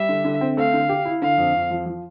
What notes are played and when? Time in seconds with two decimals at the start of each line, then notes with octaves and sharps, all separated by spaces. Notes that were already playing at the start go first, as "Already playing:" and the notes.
Already playing: G3 E5
0.09 D3
0.24 D3
0.41 C4
0.57 A3 F5
0.74 D3
0.89 G4
1.05 E4
1.22 D3 F5
1.38 F2
1.54 F2
1.70 F3
1.86 F3